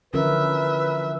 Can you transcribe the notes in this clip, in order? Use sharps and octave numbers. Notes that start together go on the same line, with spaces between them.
D3 E3 F3 C#4 A#4 B4 E5